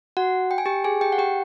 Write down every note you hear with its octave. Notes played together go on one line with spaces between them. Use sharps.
F#4 F#5
G5
G#5
G4 G5
G#4 G#5
G4 G5
F#5
G4 G5